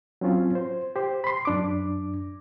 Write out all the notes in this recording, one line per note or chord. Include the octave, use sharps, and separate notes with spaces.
F#3 C4 C#4 F4
C5
G4 C5
B5 C6
F#2 D4 D6